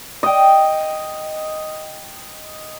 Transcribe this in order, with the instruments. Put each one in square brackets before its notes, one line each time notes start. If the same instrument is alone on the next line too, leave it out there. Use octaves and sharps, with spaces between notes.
[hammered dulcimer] D#5 G5